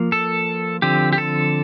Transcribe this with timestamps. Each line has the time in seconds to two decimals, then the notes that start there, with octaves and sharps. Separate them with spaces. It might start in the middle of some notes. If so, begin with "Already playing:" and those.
Already playing: F3 A#3
0.12 A4
0.82 D3 F3 C4 G4
1.13 G4
1.18 A4